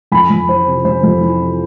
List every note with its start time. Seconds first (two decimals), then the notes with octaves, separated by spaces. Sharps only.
0.12 F2 G#5 B5
0.30 F2
0.49 E3 C5
0.66 C3
0.85 F2 C5
1.03 F2
1.21 E3
1.39 C3